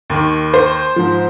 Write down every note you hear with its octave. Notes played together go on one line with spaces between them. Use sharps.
D#2 D#3
C5
G#2 F3